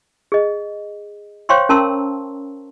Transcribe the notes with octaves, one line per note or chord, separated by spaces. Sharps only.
G#4 D#5
C5 C#5 F5 G5 C6 C#6
C#4 A#4 A5 A#5 C6 E6